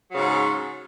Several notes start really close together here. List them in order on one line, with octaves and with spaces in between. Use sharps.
F#3 C#3 G#2